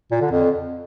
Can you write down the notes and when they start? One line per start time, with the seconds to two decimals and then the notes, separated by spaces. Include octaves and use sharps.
0.11 A#2
0.21 D3
0.31 F2